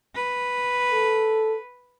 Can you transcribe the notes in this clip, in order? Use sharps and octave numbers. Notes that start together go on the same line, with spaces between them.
B4
A4